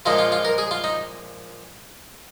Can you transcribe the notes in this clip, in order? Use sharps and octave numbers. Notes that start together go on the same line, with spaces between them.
A#2 F3 G#3 D#4 F4
F4
F4
A#4
G#4
F4
D#4